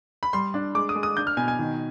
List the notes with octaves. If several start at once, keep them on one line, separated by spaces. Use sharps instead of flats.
B5
G3 C6
D4
G#3 D6
D#6
G#3
D#6
D4 G6
F6
B2 G#5
G#5
D#3